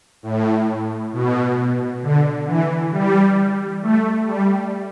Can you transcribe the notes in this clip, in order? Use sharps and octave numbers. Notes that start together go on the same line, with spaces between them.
A2
B2
D3
E3
G3
A3
G3